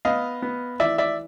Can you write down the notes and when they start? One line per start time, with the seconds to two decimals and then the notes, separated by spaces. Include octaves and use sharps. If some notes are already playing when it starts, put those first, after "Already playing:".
0.05 B3 D#5 F5
0.42 B3
0.80 E3 D5 E5
0.98 D5 E5